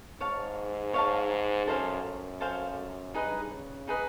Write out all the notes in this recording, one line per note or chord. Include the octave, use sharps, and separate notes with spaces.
G#2 C#5 F5 A5
C#5 F5 A5
F#2 A4 C5 F5 G#5
F#2
A4 C5 F5 G#5
G2 D#4 G#4 B4 D#5
C#3
D#4 G#4 B4 D#5